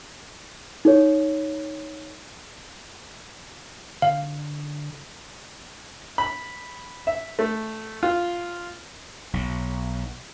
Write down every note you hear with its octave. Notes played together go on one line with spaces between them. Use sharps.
D#4 A4 C#5
D3 F5
B5
E5
A3
F4
B1